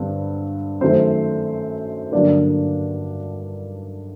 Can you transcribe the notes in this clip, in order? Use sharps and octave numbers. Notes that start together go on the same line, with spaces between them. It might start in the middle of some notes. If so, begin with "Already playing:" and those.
Already playing: G2 D3 G3 C4
F#2 D#3 A3 C4 C5
G2 D3 F#3 A#3 D4 D5